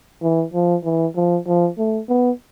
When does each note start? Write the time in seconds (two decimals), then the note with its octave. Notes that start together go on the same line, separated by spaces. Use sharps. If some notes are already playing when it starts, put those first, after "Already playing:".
0.23 E3
0.54 F3
0.85 E3
1.16 F3
1.47 F3
1.78 A3
2.09 B3